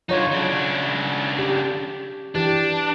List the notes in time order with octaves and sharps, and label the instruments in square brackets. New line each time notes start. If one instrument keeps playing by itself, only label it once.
[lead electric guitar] D3 D#4 [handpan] F#3 F4 C#5
[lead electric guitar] C#3 D4
[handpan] G4
[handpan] E3 G4 [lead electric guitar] D4